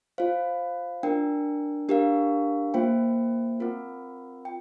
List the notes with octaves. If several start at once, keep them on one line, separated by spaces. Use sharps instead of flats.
F4 C5 F5
D4 A#4 G5
D4 G4 A#4 F5
A#3 F4 C5 G5
C4 F4 A#4
G5